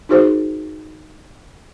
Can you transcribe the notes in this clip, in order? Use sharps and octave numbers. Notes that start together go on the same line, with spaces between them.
D#4 F#4 G#4 A#4 C5